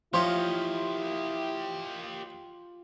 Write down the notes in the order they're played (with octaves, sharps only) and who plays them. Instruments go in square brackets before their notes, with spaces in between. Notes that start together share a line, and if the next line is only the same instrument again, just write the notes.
[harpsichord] F3 C5 C#5 [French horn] E4 [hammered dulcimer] F4 [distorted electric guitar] G4 D#5